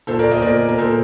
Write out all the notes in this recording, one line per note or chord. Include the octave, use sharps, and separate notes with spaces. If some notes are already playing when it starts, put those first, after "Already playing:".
A#2 A4 C5
A#4 D5
C5 D#5
A#2 A#4 D5
A#4
A#2 A4 C5